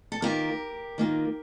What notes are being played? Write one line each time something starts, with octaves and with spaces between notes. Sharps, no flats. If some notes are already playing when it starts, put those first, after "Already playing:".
A4
D#3 A#3 F4 G4 A#4
D#3 A#3 F4